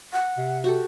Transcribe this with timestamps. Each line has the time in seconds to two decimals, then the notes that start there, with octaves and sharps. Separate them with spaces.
0.13 F#5
0.37 C3
0.64 F#4 G4 A4